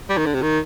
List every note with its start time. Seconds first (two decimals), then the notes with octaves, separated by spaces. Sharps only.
0.09 G3
0.17 D#3
0.26 D3
0.34 C3
0.42 D#3